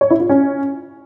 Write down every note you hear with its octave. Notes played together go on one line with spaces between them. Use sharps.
C#5
E4
F4
C#4